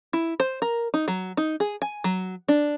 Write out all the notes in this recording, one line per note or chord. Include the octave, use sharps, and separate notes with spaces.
E4
C5
A#4
D#4
F#3
D#4
G#4
G#5
F#3
D4